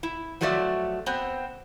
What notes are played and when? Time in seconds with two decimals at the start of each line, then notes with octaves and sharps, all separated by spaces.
0.03 E4
0.41 F3 F#3 A3 F#4 D5 E5
1.06 B3 C4